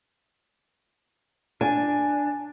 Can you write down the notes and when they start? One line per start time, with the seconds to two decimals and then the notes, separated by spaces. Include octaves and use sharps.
1.61 D4 G#5